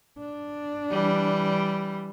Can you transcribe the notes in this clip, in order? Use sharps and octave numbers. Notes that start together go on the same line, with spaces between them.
D4
E3 G3